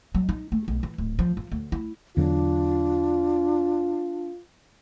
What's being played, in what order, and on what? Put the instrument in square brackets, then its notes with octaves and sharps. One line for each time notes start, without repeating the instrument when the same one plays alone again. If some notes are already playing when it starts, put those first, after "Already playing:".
[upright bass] F#3
D#4
A3
B1
E3
D1
F3
F3
D2
E4
[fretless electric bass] E2 D3 F#3 [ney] D4 [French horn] F4